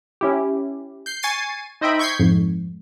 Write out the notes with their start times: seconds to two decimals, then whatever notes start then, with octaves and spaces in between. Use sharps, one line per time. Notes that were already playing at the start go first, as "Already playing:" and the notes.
0.21 C#4 E4 G4
1.06 G6 C7
1.23 G#5 C#6 A6 C7 D#7
1.81 D#4 C5 D#5 E5 G5 B5
1.99 C#6 G6 G#6 B6 C7
2.19 F2 G#2